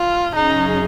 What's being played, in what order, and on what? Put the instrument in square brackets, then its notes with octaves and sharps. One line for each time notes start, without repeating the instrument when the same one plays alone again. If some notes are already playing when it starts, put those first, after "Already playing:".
Already playing: [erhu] F4
[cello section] F#2 C#3 F#3 C#4 G#4 [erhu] D#4